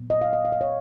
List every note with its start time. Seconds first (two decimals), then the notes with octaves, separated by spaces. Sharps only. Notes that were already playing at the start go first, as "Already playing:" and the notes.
Already playing: A#2 F#3 B3
0.10 D#5
0.21 F5
0.33 D#5
0.45 F5
0.52 D#5
0.61 C#5